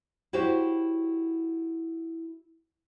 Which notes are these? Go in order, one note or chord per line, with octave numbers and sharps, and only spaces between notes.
E4 F#4 G4 C5 C#5